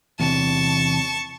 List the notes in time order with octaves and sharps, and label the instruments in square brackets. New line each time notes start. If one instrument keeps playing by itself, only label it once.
[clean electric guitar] E2 C3 E3 [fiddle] A5 C#6